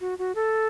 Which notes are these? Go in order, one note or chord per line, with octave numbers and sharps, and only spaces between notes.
F#4
F#4
A4